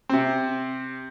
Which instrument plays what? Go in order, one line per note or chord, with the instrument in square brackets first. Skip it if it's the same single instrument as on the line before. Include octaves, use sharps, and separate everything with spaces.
[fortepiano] C3 C4